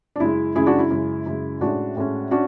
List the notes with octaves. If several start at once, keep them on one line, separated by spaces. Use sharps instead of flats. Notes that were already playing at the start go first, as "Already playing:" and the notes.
D4
F#2 C#3 G#3 E4
F#2 C#3 G#3 E4 G#4
D4 F#4
E4
F#2 C#3 G#3
F#2 C#3 G#3
A2 G#3 C#4 D4 F#4
A2 G#3 C#4
C#4 D4 F#4